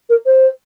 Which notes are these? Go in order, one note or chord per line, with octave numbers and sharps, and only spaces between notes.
A#4
C5